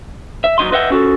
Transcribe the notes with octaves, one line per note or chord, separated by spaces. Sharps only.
E5
D#2 F#3 D#4 D#5 C6
B4 D#5 E5 F#5 G5
C#4 F#4 A4